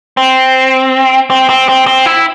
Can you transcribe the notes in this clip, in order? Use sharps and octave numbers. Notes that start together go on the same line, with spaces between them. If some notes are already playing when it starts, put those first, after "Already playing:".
C4
C4
C4
C4
C4
E4